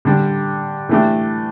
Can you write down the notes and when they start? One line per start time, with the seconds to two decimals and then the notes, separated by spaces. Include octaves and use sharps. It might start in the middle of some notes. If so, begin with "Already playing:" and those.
0.05 D3 G3 D4
0.89 E3 A3 D4 G4